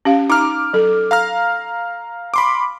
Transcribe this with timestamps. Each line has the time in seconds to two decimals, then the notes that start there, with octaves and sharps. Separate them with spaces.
0.05 C#4 G4 F5
0.30 D#4 A#5 D6 F6
0.73 F#3 A4
1.11 F5 A#5 F6
2.34 B5 C6 D6